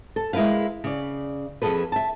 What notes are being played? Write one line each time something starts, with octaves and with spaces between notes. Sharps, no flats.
A4
G#3 E4 A#4 B4 F5
C#3 D5
F2 F#3 G#4 A4 B4
E5 A5